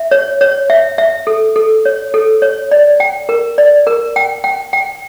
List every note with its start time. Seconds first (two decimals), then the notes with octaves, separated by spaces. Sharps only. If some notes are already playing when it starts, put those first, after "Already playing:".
Already playing: E5
0.11 C#5
0.41 C#5
0.70 E5
0.98 E5
1.27 A4
1.56 A4
1.85 C#5
2.14 A4
2.42 C#5
2.71 D5
3.00 G5
3.29 A#4
3.58 D5
3.87 A#4
4.16 G5
4.44 G5
4.73 G5